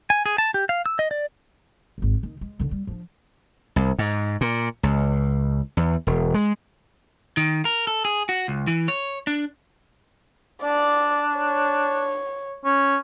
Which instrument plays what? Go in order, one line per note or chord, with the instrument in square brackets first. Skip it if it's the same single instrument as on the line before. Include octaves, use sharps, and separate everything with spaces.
[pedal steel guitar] G#5
G#4
A5
G4
F5
E6
D#5
D5
[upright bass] G#1 D2
D#3
G#3
D3 D#3
G3
F3 D4
[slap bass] C2
G#2
A#2
C#2
E2
E1
G#3
[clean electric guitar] D#3
A#4
A4
G#4
F#4
C#2
E3
C#5
D4
[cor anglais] D4 [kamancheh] D5
[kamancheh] C#5
[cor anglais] C#4